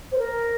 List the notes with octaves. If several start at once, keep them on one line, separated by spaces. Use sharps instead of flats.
C5
A#4